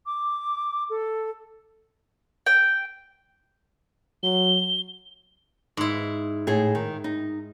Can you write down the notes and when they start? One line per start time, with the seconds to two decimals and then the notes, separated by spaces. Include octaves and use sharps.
0.06 D6
0.90 A4
2.46 G5
4.23 F#3 G7
5.77 G#2 E4
6.47 A2 G#4
6.75 D#3
7.04 D#4